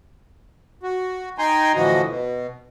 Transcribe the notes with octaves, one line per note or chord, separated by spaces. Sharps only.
F#4
D#4 G5 G#5 A#5 C6
A2 D3 E3 F3 F#4 D#5
B2